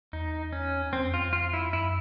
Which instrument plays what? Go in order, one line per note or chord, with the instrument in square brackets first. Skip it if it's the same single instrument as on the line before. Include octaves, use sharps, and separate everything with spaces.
[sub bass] E2 [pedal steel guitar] D#4
[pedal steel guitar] C#4
[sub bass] F2 [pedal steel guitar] C4
[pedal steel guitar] F4
F4
E4
[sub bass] F#2 [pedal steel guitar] E4